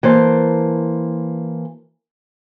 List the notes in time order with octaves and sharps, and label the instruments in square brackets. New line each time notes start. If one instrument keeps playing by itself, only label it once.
[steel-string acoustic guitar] E3 A#3 C5 A5